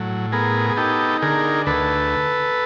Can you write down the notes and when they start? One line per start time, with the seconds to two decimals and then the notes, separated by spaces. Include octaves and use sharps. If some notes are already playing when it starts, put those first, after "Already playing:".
Already playing: A2 F#3
0.32 B3 G#4 A#4
0.70 G#4
0.77 D#4 G4 A4
1.22 D3 G#4 A#4
1.66 D2 A4 B4